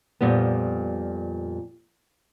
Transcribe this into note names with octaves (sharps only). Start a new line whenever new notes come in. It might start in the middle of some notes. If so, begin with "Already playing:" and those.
F2 A#2 G3 B3